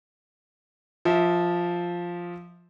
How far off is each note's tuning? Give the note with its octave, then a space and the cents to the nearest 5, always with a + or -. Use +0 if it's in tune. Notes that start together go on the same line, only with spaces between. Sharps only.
F3 +0 E5 -30